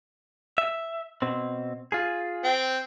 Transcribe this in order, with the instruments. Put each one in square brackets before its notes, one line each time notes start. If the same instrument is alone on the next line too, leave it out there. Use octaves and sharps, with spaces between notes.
[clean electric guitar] E5
B2 C4
F4 G#4
[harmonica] C4 G5